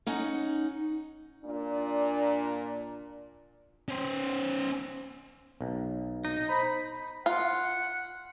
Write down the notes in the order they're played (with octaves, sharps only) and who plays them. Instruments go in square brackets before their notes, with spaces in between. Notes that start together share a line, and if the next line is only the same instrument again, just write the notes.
[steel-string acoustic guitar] C#4 D#4 F#5
[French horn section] A#2 D4
[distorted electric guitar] C#4 C5
[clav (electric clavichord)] B1
[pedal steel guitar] D#4
[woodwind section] C5 A#5 B5
[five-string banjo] F4 [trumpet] F#5